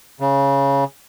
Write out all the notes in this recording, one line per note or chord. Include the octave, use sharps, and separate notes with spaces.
C#3